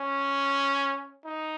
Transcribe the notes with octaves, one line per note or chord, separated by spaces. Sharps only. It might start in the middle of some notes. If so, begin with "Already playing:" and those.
Already playing: C#4
D#4